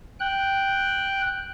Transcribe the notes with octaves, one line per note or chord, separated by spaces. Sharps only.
G5 F#6